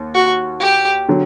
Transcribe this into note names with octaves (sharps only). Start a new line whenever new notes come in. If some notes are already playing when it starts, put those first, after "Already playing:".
Already playing: D#2
F#4
G4
D3 F#3